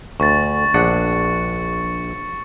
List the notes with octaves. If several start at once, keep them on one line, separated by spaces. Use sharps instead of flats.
D2 C#6 A6
A#1 D4 F#5 A6 C#7